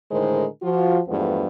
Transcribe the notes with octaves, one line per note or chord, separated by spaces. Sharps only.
A2 D3 D#3 G#3 A#4 C5
F3 F4 F#4
E2 G2 F3 G#3 A3 B3